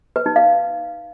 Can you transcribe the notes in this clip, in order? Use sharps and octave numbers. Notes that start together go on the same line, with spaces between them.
B4
D#4
F5